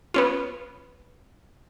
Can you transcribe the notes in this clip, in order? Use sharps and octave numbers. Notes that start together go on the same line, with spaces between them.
B3 C#4 F4